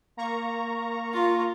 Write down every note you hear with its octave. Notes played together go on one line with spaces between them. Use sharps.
A#3 A#5 C#6
F4